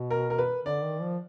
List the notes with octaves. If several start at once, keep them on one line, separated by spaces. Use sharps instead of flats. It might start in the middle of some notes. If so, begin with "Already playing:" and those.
Already playing: B2
A#4
A#4
B4
D3 D5
D#3
F3